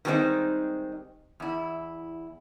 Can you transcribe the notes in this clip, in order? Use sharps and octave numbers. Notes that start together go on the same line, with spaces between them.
D#3 G3 G#3 B3 C4 D#4
E2 E4